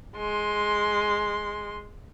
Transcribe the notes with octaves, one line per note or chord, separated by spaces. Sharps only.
G#3 C6